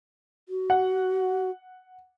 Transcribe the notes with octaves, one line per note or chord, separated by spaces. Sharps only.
F#4
F#5